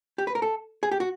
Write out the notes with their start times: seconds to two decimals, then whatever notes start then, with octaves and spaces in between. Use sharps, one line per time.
0.18 G4
0.27 B4
0.35 A#4
0.42 A4
0.83 G#4
0.91 G4
1.00 F#4